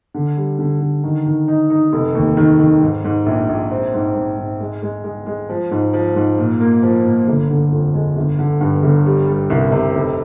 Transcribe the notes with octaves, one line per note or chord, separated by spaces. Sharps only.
D3
G3
D3
D3
D#3
D#3
D#4
D#4
F1
D#2
D#3
D#3
G#2
G#2
A#1
A#1
C4
G#2
G#2
G#2
G#3
G#3
G#3
G#3
F3
G#2
F3
G#2
A#2
A#3
F3
A#2
G1
D3
F2
G#3
G1
D3
G2
G1
G3
G3
C2
C3
F1